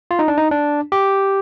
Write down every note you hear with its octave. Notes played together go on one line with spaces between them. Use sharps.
F4
D#4
D4
D#4
D4
G4